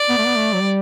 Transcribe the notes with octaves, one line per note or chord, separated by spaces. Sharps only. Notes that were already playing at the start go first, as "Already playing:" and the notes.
Already playing: D5
B3
A3
B3
A3
F#3
G3